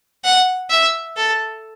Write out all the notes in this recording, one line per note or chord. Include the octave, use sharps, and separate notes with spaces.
F#5
E5
A4